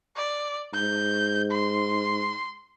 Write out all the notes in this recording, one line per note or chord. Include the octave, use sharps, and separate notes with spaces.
D5
G#2 G6
C6